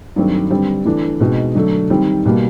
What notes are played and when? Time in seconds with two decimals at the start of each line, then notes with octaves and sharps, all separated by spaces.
0.16 G2 D#3 F#3 A3 C4
0.50 G2 D3 G3 C4
0.85 E3 A3 D4
1.20 B2 G#3 C4 D#4
1.55 D3 F#3 A3
1.90 D#3 G3 C4
2.25 B2 G3 A#3